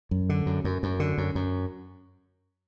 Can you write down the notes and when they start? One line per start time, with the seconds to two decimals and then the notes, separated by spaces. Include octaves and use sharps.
0.11 F#2
0.29 D3
0.46 F#2
0.64 F#2
0.83 F#2
1.00 D3
1.18 F#2
1.35 F#2